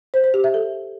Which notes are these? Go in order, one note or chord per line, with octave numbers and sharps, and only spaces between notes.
C5
C5
G4
E5
A4